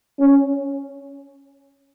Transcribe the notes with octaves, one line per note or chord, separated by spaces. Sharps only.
C#4